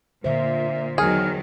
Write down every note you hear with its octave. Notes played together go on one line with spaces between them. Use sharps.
A#2 D3 C5 E5
E2 D#3 F#3 G#4 F6